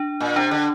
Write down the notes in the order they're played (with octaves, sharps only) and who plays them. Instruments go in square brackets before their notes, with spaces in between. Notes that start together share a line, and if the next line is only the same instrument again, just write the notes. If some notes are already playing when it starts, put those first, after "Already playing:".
Already playing: [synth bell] D4
[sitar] A#2
[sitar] C3 [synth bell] D4
[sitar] D3